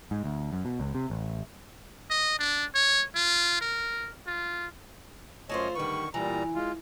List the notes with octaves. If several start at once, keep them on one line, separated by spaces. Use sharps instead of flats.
G#2
D2
F#2
B2
C#2
C3
A1
D#5
D4
C#5
F4
A#4
F4
F#2 A3 F4 C5 C#5 D#5
D3 D#3 G3 B4 C#6
A#2 E3 G3 A#5
G#3 F4